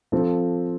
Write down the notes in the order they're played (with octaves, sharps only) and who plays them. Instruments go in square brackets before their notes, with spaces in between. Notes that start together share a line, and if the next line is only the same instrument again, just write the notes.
[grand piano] F3 C4 F4 A4